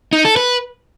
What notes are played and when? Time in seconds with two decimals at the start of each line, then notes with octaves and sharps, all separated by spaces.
0.13 D#4
0.25 A4
0.37 B4